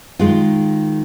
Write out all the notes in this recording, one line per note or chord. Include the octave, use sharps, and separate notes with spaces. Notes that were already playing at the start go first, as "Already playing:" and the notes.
D#3 G#3 F4